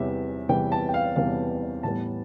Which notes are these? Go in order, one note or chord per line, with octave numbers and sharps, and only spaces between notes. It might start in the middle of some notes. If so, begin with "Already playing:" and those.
Already playing: E2 C3 E3 G3 B3 E5
E2 C3 E3 G3 B3 G5
A5
G5
F5
E2 C3 E3 G3 B3 F5
A2 E3 G3 B3 A5